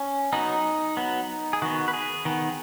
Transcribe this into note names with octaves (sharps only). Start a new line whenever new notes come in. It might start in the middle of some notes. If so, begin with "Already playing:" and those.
Already playing: C#4
F#3 B3 D#4
F#3 B3
G#4
D#3 B3 F#4
B4
G#4
D#3 B3